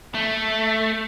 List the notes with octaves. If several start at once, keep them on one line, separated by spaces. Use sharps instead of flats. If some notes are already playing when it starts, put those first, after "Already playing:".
A3